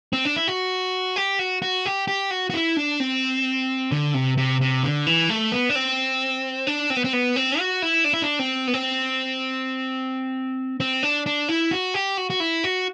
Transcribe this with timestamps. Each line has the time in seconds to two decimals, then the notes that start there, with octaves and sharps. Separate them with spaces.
0.13 C4
0.25 D4
0.36 E4
0.48 F#4
1.16 G4
1.39 F#4
1.62 F#4
1.85 G4
2.08 G4
2.31 F#4
2.50 F#4
2.54 E4
2.77 D4
3.00 C4
3.92 D3
4.14 C3
4.37 C3
4.61 C3
4.83 D3
5.07 E3
5.29 A3
5.52 B3
5.69 D4
5.75 C4
6.67 D4
6.90 C4
6.97 B3
7.04 C4
7.13 B3
7.36 C4
7.59 F#4
7.82 E4
8.04 D4
8.13 E4
8.22 D4
8.39 C4
8.67 B3
8.74 C4
10.80 C4
11.03 D4
11.26 D4
11.49 E4
11.71 F#4
11.94 G4
12.17 F#4
12.30 F#4
12.40 E4
12.64 F#4